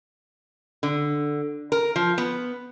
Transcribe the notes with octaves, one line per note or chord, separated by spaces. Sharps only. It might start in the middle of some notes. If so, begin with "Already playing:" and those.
D3
A#4
F3
B3